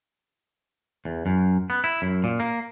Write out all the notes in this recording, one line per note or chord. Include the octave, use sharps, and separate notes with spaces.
E2
F#2
B3
E4
F#2
A#2
A#3